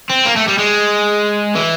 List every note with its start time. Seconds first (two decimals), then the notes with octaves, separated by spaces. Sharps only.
0.10 C4
0.25 A#3
0.36 A3
0.48 G3
0.58 G#3
1.55 E3